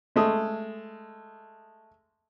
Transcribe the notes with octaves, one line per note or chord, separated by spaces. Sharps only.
G#3 A3 D#6